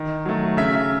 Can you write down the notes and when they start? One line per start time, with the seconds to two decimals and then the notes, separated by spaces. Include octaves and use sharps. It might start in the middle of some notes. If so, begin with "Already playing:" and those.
Already playing: D#3
0.25 F#3 A3
0.57 C#3 E5